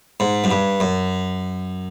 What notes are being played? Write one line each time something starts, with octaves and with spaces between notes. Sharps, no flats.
G#2
F#2
G2
F#2